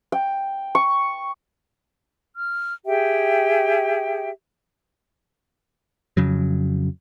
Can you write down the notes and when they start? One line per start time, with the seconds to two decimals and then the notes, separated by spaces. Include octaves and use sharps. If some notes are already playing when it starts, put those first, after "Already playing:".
0.12 G5
0.75 C#6
2.35 F6
2.86 G4 G#4 E5 G5
6.17 F2 C#3 F#3